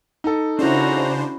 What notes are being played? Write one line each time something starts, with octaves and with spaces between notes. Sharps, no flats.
D#4 A4
C#3 C#4 D4 E4 F#4 C5 A#5